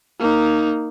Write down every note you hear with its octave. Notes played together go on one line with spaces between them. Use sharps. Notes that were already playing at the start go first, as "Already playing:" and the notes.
A#3 D#4